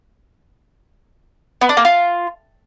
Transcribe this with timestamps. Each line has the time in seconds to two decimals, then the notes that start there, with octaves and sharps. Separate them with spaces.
1.61 B3
1.69 D4
1.77 A#3
1.85 F4